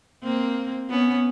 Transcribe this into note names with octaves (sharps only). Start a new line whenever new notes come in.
A#3 C4
B3 C#4